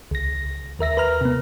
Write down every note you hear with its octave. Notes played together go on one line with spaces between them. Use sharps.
C#2 A#6
D#2 A#4 E5 A#6
B4 A#5 F6
C3 B3